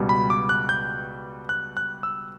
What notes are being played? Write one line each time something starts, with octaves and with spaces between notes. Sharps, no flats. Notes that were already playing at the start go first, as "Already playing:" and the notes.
Already playing: C#2 B2 G3
B5
D6
F#6
G6
F#6
F#6
E6